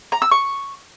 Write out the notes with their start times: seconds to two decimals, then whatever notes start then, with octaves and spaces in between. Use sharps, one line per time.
0.12 A#5
0.22 E6
0.31 C#6